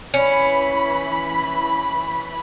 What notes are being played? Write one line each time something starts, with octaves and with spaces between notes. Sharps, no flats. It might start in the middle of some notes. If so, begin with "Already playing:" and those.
E3 C#4 B5